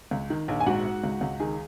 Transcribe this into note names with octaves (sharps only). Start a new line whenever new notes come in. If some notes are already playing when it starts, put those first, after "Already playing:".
C#2
D#3
A#1
G#5
G#2 F#4 F#5
G#2
C#2
C#2
D#3 G#4 G#5